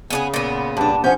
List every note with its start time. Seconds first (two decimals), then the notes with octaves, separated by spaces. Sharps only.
0.10 C#3 B3 D4 G#4
0.34 A#2 B3
0.77 G2 D4 A5
1.04 F3 C#4 C5 F#5 G#5 G6